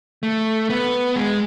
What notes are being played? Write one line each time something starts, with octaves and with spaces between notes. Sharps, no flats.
A3
B3
G#3